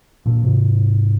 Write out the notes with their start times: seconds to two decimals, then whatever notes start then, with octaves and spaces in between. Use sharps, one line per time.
0.26 A#2 D3
0.43 G#2 C3